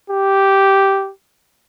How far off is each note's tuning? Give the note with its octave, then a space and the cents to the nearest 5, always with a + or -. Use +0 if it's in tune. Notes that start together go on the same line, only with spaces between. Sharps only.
G4 -5